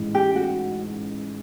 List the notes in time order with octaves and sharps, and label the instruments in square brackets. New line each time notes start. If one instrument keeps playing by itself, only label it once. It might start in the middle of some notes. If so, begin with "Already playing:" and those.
Already playing: [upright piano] A1 G#2 E3
[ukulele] G4
F#4